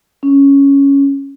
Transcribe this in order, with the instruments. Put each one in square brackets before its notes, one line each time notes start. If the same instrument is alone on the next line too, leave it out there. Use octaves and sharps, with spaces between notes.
[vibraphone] C#4